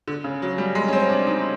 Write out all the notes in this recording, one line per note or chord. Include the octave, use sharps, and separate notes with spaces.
D3
C#3
F#3
G3
G#3
C#4
C4
D4
D#4